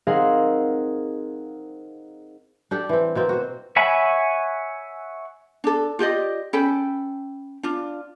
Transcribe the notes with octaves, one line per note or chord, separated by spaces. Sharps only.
C4 D#4 G#4 A#4 F5 F#5
D4 G4 A4
E3 C4
B2 A#3 C4
F#4 C5
C#5 E5 F#5 G#5 B5
D4 A4
F4 G4 D5 D#5
C#4 A4 G5 B5
D4 F4